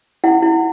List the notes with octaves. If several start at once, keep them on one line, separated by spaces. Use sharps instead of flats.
E4 F#5
E4